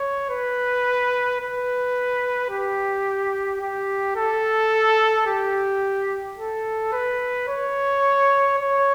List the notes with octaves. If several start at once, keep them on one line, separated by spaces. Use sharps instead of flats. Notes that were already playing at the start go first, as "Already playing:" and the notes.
Already playing: C#5
B4
B4
G4
G4
A4
G4
A4
B4
C#5
C#5